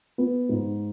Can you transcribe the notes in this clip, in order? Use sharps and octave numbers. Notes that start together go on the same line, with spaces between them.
B3
G#2